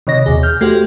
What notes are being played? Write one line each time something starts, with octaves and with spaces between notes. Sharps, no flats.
C3 D#3 C#5 D#5 A#6
D#2 B2 G#4
F6 G6
A3 F#4 G4 C5